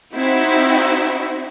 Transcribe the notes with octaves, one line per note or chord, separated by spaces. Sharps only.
C4 D#4 E4 F#4